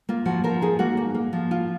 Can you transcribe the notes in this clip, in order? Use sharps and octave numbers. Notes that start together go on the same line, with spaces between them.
A#3 F4
F3 F#4
F3 A#4
D#4 G#4
A#3 F#4
A#3
A#3
F3
F4